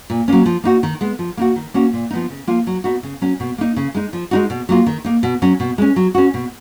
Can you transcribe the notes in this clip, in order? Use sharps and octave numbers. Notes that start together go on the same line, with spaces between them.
A#2
F#3 A#3 C#4
F3
A#3 D#4 F#4
D#3
G#3 B3
F3
A#3 D#4 F#4
D#3
A#3 C#4 F#4
A#2
F3 B3 D#4
C#3
F3 A#3 F4
F#3
B3 D#4 F#4
C#3
F#3 C#4
B2
A#3 D#4
C#3
G#3 D#4
F3
G#3 D#4 F#4
B2
F#3 A#3 F4
D#3
A#3 D#4
B2
F#3 C#4 F#4
B2
G#3 C#4
F#3
C#4 F#4
B2